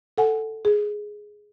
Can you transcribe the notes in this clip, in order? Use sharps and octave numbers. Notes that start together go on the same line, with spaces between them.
A4 F#5 G#5
G#4